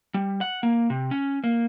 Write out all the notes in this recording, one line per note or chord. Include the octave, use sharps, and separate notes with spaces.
G3
F#5
A#3
C3
C#4
A#3